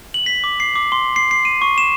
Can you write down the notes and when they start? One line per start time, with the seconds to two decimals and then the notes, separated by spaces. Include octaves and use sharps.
0.14 F#7
0.26 B6
0.44 D6
0.60 C7
0.76 D6
0.92 C6
1.16 C7
1.31 C7
1.45 D#7
1.62 C#6
1.78 E7